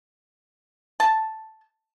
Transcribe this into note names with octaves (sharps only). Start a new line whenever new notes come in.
A5